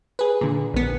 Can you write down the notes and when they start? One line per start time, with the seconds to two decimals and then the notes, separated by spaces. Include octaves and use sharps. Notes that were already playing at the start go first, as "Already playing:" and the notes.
0.19 G#4 B4
0.41 A#2 D3
0.74 A#1 B3